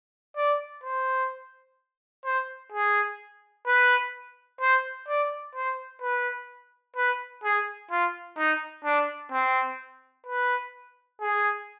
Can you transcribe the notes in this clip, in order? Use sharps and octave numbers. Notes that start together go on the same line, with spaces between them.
D5
C5
C5
G#4
B4
C5
D5
C5
B4
B4
G#4
F4
D#4
D4
C4
B4
G#4